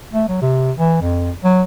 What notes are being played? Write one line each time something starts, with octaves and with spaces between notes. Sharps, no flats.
A3
F#3
C3
E3
F2
F#3